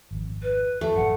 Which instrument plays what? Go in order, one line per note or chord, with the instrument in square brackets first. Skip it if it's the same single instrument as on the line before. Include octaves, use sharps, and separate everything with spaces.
[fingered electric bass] G#1 F2
[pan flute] B4
[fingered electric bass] F2 [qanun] A3
[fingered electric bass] A1 F#2 [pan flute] F#5